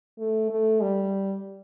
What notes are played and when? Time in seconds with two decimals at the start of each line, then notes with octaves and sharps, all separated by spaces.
0.19 A3
0.50 A3
0.81 G3